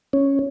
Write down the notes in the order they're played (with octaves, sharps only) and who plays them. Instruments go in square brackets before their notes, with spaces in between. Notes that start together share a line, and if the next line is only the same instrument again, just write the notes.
[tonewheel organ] C#4